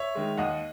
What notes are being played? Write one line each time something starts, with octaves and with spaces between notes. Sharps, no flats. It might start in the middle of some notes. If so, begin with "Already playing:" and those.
Already playing: C#5 E5
D#3 G#3
D#2 D#5 F#5